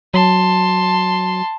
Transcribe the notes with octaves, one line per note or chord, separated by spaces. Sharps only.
F#3 A5 C6